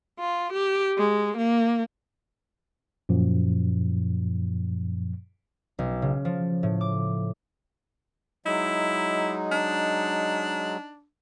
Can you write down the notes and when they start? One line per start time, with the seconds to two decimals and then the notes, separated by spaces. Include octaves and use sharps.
0.19 F4
0.53 G4
0.98 G#3
1.38 A#3
3.09 F#2 A#2 F3
5.79 B1
6.02 C#3
6.25 F3
6.63 A2
6.81 D6
8.46 F#3 G#3 D#4 E4
9.52 D4